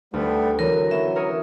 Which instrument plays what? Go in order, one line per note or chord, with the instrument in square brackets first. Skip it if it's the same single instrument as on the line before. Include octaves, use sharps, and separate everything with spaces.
[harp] D2 [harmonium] G3 A3 B3
[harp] E3 [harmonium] F#3 [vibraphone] A#4
[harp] B3 C#4 [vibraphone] E5
[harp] A#4 C#5 D#5